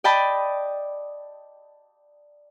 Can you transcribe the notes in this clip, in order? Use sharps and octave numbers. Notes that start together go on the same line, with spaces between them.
D5 D#5 G5 A5 B5